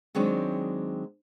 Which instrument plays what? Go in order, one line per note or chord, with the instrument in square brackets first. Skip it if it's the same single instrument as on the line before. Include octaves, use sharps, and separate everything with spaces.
[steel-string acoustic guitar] D#3 F#3 G#3 C4 D4